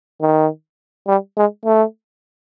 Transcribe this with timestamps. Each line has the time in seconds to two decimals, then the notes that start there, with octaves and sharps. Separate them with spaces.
0.21 D#3
1.07 G3
1.37 G#3
1.65 A3